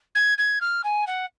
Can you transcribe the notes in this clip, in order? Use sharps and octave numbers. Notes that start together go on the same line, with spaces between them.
G#6
G#6
F6
G#5
F#5